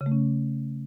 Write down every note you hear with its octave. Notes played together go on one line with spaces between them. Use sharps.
C#3
A3
C#4